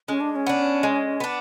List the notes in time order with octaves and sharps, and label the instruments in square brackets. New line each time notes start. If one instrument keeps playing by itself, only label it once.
[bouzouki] G#3 [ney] C#4
[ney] D4
D4
C#4
[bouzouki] B3 D4
G#3
B3 D4